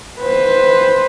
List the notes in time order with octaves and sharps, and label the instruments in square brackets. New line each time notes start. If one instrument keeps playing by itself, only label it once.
[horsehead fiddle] B4 C5